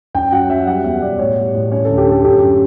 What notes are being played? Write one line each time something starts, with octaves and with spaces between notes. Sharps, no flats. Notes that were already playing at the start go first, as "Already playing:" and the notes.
F#2 G5
F#3 F#5
F#3 E5
G3 F#5
E2 E5
B2 D5
A2 C#5
G3
A2
C#4 C#5
D2 A4
G4
D3 A4
F#2 G4